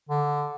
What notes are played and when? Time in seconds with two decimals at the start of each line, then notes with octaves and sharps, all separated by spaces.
0.09 D3